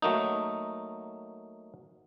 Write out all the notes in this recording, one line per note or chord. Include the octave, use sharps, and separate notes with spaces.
F#3 A3 A#3 D#4